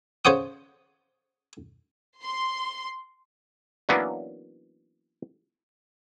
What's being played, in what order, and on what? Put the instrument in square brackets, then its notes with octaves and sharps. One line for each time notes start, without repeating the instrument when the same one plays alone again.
[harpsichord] C#3 C5 C#5 F#5 D#6
[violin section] C6
[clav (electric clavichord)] E3 F#3 A#3 B3 C#4 D4